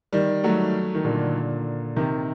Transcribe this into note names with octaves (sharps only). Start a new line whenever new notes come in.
D#3 G3
F#3 A3
D#3
A#2 D3
C3 D#3